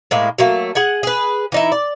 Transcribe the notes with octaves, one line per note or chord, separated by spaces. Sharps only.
A2 G#3 A#3
F#3 A3 A#3
G#4 F#5 G#5
G#4 B4
E3 D#4 E4
D5